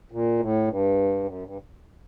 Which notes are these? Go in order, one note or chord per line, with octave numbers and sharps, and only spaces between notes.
A#2
A2
G2
F#2
G2